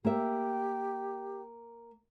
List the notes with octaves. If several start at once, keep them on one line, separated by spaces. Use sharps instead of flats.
A#3 G4 E5